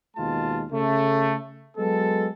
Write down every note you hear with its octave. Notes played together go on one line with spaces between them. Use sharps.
D#2 B2 G#3 F4 A5
C#3 A3
F#3 G#3 B3 A4